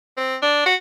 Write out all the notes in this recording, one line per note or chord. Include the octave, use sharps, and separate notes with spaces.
C4
D4
F#4